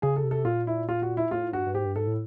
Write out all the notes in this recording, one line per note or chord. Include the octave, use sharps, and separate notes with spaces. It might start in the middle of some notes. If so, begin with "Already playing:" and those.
C#3 G#4
A4
C3
A4
A#2 F4
E4
F4
F#4
E4
A2 F4
G2 F#4
G2
G#2 G4
G2
G#2 A4
A2